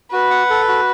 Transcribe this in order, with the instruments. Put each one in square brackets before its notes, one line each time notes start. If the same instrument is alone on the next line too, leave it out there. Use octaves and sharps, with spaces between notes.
[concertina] F#4 [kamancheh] B4
[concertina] F#5
A4
F#4